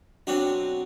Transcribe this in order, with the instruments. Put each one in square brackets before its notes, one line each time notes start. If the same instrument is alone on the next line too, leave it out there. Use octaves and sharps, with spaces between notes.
[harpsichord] B2 F#3 C4 D4